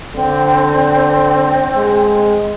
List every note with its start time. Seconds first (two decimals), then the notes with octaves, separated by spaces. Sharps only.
0.15 D3 C4
1.77 G#3